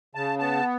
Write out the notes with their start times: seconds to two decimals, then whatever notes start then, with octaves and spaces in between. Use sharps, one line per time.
0.15 C#3 A5
0.39 B3 A5